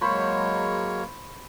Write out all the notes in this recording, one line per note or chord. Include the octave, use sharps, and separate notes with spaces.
F#3 G#3 A#3 C5 C#5 B5 C#6